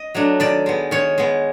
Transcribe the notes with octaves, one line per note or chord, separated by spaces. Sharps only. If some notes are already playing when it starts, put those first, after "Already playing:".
Already playing: D#5
F#3 A3 D4
D#3 D5
G#3 B3
D#3 C#5
G#3 B3